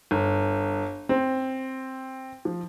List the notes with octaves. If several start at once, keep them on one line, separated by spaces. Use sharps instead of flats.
G1
C4
F3